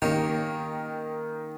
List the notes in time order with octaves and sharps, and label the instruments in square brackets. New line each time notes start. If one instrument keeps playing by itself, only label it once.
[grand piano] D#3 [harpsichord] A#3 C#4 G4